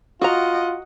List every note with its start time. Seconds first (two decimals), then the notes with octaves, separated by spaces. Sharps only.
0.22 F4 F#4 D#5 F#5 A#5